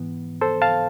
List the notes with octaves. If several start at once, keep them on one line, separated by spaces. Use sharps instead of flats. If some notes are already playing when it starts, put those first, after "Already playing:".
Already playing: G#2 E3 B3
A4 C5
F5 A5